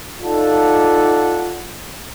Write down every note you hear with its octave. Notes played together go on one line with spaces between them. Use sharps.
D#4 F4 A4 D5 F#5 A5